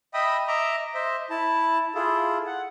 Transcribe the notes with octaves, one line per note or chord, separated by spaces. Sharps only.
D#5 E5 G5 B5 D#6
D#5 E5 A#5 D6
C5 D#5 E5
E4 A5
E4 F4 G#4 A4
F#5